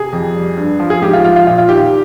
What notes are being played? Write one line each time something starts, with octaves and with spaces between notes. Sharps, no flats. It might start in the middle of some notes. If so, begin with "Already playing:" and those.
Already playing: C3 G#4
F2
G3
G2
F3
G#4
G#2 G4
F4
F3 F4
F4
A#2 F4
F4
D#3 G4